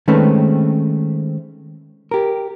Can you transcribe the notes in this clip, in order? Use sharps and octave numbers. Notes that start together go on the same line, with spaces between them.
D#3 G#3 A3 C4 C#4 B4
G4 A#4